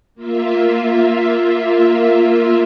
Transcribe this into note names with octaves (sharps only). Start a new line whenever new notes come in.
A#3 F4 E5